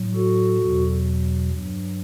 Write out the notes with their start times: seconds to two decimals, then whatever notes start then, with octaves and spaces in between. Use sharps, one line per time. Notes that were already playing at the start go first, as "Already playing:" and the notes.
Already playing: A2 F#3
0.15 F#4 A4
0.60 E2 B2 F#3
1.52 G2 F#3